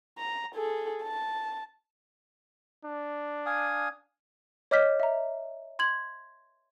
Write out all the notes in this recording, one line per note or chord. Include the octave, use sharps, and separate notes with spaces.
A#5
G#4 A4
A5
D4
F5 G#5 D#6
C#5 D#5 D6 F6 G6 B6
E5 A#5
C6 G#6 F#7